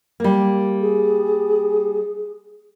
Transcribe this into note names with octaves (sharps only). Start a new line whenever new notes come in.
G3 A#3
G#4